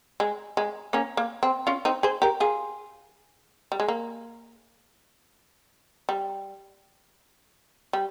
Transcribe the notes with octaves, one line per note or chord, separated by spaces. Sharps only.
G#3
G#3
A#3 C#4
A#3
C4
C#4 F4
C4 D#4
G#4 C5
G4 A#4
F4 G#4
G3
G#3
A#3
G3
G3